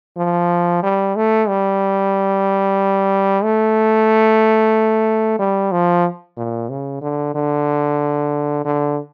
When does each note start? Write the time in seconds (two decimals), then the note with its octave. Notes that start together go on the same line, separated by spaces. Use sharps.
0.17 F3
0.83 G3
1.16 A3
1.48 G3
3.44 A3
5.39 G3
5.72 F3
6.37 A#2
6.70 C#3
7.01 D3
7.35 D3
8.65 D3